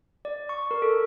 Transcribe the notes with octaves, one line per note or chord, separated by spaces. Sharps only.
D5
C#6
A#4
A4